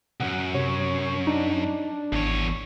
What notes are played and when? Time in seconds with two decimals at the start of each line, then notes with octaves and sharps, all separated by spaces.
0.20 C2 F#2 F#5
0.54 C3 C#5
1.27 D4 D#4
2.12 G#1 E2 C#5